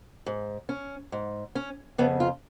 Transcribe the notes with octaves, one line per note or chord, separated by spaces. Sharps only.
G#2
C#4
G#2
C#4
F2 C#3 B3
F4